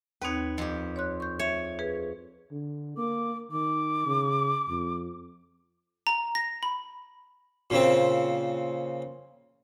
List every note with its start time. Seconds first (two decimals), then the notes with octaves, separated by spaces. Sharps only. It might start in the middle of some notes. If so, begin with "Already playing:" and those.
0.22 D#2 C4 D#4 B4 C#5
0.58 F2 G4
0.96 C#5 C6 F#6
1.20 C#6 G6
1.39 C#5 E5
1.79 G#4 B4
2.51 D3
2.97 A#3 D6
3.52 D#3 D6
4.06 C#3
4.69 F2
6.07 A#5
6.35 A#6
6.63 B5
7.70 A#2 C#3 C4